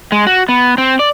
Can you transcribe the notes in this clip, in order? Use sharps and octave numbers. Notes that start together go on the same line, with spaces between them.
G#3
F#4
B3
C4
D5